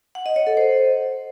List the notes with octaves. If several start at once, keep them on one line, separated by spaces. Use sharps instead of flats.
F#5
D#5
C#5
A4
C5